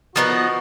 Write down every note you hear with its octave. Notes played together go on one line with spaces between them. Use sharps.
F3 B3 D#4 F#4 A#4